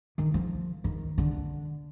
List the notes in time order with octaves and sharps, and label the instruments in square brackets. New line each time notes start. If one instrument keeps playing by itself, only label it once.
[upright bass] D#3
F3
D#3
D3